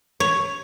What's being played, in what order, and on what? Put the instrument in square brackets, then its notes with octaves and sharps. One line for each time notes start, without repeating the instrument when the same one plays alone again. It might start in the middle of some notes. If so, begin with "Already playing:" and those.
[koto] C#5